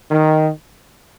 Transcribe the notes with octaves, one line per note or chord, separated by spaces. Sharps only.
D#3